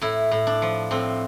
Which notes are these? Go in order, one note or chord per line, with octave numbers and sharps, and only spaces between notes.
A2 E4
A2
D4
F3
A2 C4